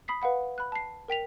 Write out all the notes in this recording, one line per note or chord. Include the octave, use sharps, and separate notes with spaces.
B5 D#6 B6 C7
B4 F5 F#5 B5
B5 F#6
A5 C7
A#4 G5 B6 F7